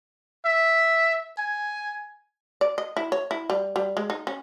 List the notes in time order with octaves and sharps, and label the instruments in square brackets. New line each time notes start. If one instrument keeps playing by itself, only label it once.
[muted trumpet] E5
G#5
[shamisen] D5
D#5
E4
C#5
E4
G3
G3
G#3
D#4
C#4